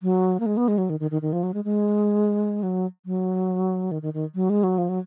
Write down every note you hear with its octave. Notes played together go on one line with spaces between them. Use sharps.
F#3
A#3
G#3
B3
G#3
F#3
D#3
D#3
D#3
D#3
F3
F#3
G#3
G#3
F#3
F#3
D#3
D#3
D#3
F#3
G#3
F#3
F3
F#3